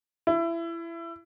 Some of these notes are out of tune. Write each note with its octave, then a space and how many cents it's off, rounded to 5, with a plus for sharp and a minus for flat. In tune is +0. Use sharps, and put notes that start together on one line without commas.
E4 +25